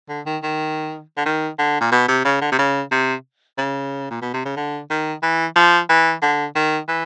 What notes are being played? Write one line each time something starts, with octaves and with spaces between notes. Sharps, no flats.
D3
D#3
D#3
D3
D#3
D3
A#2
B2
C3
C#3
D3
C3
C#3
C3
C#3
A#2
B2
C3
C#3
D3
D#3
E3
F3
E3
D3
D#3
E3